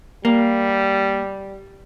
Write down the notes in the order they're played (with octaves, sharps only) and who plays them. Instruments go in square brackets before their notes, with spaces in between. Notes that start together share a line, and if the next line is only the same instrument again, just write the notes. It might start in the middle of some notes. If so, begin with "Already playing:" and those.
[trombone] G3 [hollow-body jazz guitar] A#3